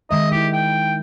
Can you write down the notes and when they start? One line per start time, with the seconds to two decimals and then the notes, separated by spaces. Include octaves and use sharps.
0.11 D#3 G#3 D#5 E5
0.32 D#4 E4 G4
0.53 G5